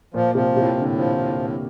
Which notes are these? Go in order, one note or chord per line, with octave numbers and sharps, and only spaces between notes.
A#2 F3
C3 F3
A2 C3
A2 D3
F3
A2
A2